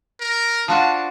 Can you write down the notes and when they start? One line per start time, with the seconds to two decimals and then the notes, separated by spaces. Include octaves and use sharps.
0.20 A#4
0.68 F3 D4 F4 F#4 A5